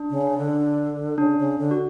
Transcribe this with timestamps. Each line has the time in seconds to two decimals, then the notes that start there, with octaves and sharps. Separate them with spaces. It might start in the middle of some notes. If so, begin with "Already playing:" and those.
Already playing: D4
0.10 C#3
0.38 D3
1.18 C#3 D4
1.39 C#3
1.58 D3
1.71 F#4